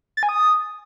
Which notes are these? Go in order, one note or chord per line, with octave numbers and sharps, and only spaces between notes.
A6
G#5
D#6